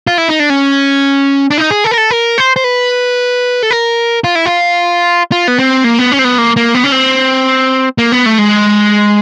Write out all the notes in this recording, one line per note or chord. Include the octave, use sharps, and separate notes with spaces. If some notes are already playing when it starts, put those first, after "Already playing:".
F4
E4
D#4
D4
C#4
D4
D#4
G#4
A4
A#4
A4
A#4
C5
C5
B4
A4
A#4
F4
E4
F4
F4
B3
C4
A#3
B3
C#4
C4
B3
A#3
A#3
B3
C#4
C4
A#3
B3
A3
G#3